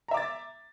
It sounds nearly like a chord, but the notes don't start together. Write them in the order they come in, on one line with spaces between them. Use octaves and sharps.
A#5 E5 D6 A6